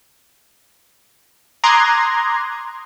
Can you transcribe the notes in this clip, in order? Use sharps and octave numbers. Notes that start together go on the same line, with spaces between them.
A#5 C6 D6 D#6 F#6 G#6